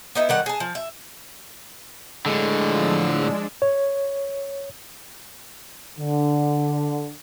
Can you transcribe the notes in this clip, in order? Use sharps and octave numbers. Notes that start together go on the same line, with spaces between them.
B3 D#4 E4
D#3 G3 F#5
G#4 A5
F3
E5
A2 D3 G#3
F3 E6
G#3 D4
C#5
D3